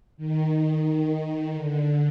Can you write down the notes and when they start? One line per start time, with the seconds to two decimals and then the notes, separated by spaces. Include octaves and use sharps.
0.17 D#3
1.55 D3